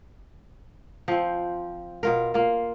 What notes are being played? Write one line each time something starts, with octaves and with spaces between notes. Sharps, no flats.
F3 C4
B2 F4 A#4
A#3 F4